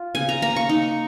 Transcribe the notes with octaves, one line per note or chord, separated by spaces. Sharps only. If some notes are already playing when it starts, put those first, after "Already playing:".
Already playing: F4
C#3 G#5
A#5
A#3 A#5
C#6
D#4